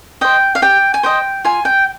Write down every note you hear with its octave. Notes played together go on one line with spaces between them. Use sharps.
C5 D#5 G5
F5
G4 G5
G#5
C5 D#5 G5
F4 G#5
G5